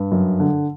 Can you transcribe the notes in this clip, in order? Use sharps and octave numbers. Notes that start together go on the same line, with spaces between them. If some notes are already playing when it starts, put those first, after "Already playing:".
Already playing: G2
F#2
D3